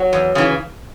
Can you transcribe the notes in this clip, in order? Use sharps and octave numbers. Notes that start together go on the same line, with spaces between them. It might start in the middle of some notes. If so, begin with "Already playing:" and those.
Already playing: F#3
E2
C#3 E3